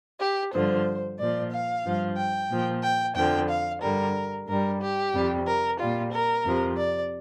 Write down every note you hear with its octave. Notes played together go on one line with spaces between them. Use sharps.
G4
G2 D3 F3 C5
A#2 F3 D5
F5
G2 F3
G5
A#2 F3
G5
F2 D3 F3 G5
F5
G2 D3 G3 A#4
G2 G3 A#4
G4
F2 C3 G3
A#4
A#2 G3 F4
A#4
F2 C3 F3
D5